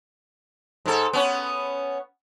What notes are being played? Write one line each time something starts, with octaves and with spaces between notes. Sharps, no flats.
G#2 A4
B3 C#4